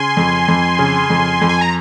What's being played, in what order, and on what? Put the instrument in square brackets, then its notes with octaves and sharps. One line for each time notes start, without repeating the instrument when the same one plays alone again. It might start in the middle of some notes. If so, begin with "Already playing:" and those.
Already playing: [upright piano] C#3 [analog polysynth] G#5 C6
[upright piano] F2
F2
C#3
F2
F2
[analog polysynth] G#5
A#5